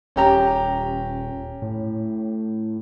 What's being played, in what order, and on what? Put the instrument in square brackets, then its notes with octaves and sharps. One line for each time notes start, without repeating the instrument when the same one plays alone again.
[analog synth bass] D#1 [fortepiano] C#4 G4 A#5
[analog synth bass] A2